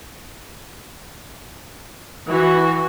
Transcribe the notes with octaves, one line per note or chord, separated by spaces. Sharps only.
E3 F#4